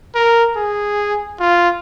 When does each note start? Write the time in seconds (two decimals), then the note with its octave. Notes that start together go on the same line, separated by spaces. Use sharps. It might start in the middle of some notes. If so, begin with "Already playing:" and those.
0.15 A#4
0.56 G#4
1.40 F4